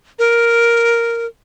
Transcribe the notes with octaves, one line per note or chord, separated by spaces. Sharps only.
A#4